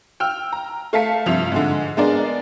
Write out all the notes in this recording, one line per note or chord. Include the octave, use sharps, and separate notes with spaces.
G5 E6 F6
A#5
A3 F5 A5 B6 C#7
G2 C3 F3 E5 F7
G#2 D3
G#3 B3 D4 A#4 D5